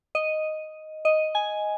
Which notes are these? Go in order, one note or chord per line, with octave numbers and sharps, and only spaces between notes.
D#5
D#5
G#5